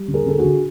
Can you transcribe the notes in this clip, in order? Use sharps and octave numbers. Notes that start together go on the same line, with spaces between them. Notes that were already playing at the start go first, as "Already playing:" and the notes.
Already playing: G3
D3
G#4 A#4
D3 A4
F#4 G#4
D3